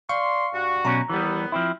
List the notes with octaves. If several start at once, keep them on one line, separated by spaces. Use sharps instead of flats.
D5 F5 C6 C#6
G2 F#4
B1 B2 C#4 A#5
D#2 E3 G3 B3
F3 C4 E4